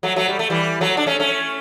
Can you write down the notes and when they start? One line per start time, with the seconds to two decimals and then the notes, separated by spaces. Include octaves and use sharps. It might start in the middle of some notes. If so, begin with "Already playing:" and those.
0.03 F#3 A3
0.16 F#3 A3
0.29 G3
0.39 A3
0.50 E3 G3
0.81 F#3 A3
0.97 D4
1.07 A3 C#4
1.20 A3 C#4